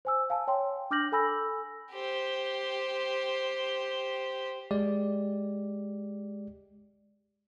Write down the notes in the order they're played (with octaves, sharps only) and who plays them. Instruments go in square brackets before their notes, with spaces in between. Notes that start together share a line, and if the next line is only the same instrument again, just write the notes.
[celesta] C5 G#5 E6
F5 G#5 A5
C#5 G5 C6
D4 D6 F6 G6 A#6 F#7
A4 G#5 B5 E6 A#6
[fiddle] G4 C5
[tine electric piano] G#3 G4 D5